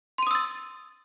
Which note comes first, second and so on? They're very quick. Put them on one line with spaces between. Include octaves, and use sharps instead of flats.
C6 D#7 D#6 E6 A6